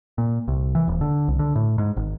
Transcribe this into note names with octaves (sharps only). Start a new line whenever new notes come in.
A#2
C2
E3
D#1
D3
C2
D3
A2
G#2
G#1